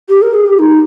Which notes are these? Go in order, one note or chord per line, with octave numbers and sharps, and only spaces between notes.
G4
A#4
G#4
G4
D#4